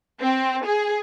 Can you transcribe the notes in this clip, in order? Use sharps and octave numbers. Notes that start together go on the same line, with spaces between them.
C4
G#4